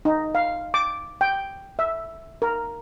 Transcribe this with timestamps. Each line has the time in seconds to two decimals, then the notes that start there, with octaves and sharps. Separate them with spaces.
0.05 D#4
0.35 F5
0.74 D6
1.21 G5
1.79 E5
2.42 A#4